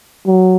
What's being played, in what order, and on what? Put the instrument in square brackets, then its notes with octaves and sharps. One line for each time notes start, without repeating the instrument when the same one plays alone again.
[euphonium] F#3